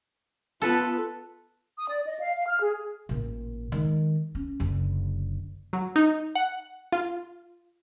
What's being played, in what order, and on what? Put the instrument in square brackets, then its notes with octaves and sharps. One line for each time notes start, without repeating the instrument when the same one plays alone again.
[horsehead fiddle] B3 F4 [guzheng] A4 B4
[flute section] D#6
D5
D#5
F5
F5
F6
G#4
[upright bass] A1 A#2
D#3 G#3
C#4
F#1 D3
[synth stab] F#3
D#4
F#5
F4